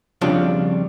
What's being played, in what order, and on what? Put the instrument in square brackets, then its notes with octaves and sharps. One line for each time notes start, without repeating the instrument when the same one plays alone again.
[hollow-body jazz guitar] F2 C#3 G3 D4 F4